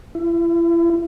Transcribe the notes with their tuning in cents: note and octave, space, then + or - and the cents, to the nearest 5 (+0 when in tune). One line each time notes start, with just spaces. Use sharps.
E4 +35